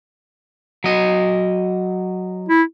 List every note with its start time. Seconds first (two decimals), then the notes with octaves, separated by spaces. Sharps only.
0.84 F#3 D#5
2.49 E4